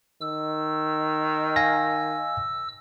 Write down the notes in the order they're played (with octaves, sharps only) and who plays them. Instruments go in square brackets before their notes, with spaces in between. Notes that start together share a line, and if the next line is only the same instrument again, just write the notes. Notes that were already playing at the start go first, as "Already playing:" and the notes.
[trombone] D#3 [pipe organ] E6
[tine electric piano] F5 G#5 A#6